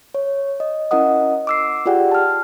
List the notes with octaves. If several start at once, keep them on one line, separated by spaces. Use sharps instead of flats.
C#5
D#5
C#4 E4 A#4 D#5 F#5 D#6
D6 E6 C7
F4 G4 G#4 D5 F#5 G5
A5 F6